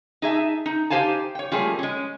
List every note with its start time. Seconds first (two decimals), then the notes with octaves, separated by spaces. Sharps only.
0.22 D#4 G#4 E5 A5
0.66 D#4
0.90 D#4 G4 C5 F5 G#5 A5
1.35 C#5 G5
1.52 F3 G3 A3 A#3 G#4
1.79 G#3 C#4